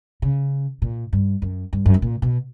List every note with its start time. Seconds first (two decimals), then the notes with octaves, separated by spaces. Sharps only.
0.22 C#3
0.82 A#2
1.13 G2
1.42 F#2
1.73 G2
1.86 F#2
1.94 G2
2.02 A#2
2.22 B2